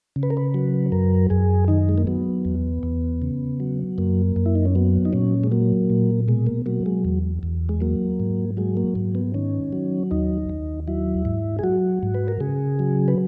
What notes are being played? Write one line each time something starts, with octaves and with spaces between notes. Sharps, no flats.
C#3
B4
A#4
B4
F#3
F#2 A#4
F#2 G#4
D#3 D#4
G#3
A#3
F#3 B3
E2
E2
C#3
F#3
F#2 A#3
F#2
E4
D#4
C#4
F#3 B3
D#4
A#2 C#4
G#3
F#3 A#3
A#2
B2 G#3
A#3
F#3 A#3
G#3
E2
E2
G#3
F#3 A#3
G#2
F#3 G#3
A#3
G#2
B3
D#3 C#4
F#3
D#2 D#4
D#2
F#3 E4
G#2
G#4
F#3 F#4
G#2
B4
A#4
C#3 G#4
F#3
B4